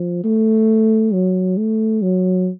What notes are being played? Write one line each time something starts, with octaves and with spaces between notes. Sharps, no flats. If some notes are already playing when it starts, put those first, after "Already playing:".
Already playing: F3
A3
F#3
A3
F#3